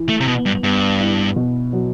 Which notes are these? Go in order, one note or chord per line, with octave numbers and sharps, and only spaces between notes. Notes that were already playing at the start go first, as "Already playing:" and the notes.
Already playing: E3
A3
C3
B2 B3
G2
G2 B3
E4
B2
F#3